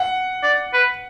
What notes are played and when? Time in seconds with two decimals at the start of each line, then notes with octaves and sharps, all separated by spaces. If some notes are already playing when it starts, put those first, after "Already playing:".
Already playing: F#5
0.43 D5
0.73 B4